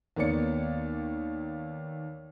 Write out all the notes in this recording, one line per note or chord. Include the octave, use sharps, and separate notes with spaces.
D#2 A#3 B3 C#5 D5 C#7